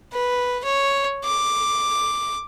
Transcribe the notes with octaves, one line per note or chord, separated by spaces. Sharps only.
B4
C#5
D6